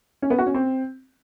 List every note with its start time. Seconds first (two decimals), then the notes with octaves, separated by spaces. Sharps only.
0.22 C#4
0.30 B3
0.38 F#4
0.46 C#4
0.54 C4